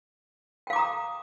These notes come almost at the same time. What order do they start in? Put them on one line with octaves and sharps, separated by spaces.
G5 F5 D6 A#5 D#6